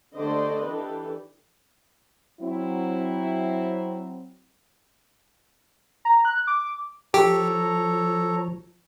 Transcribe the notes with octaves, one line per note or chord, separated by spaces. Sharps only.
D3 A3 G4 C5 D5 D#5
E3 D4 G4 A4 B4
F#3 C4 E4
A#5
F#6
D6
F3 G4 A4 C#5 A#5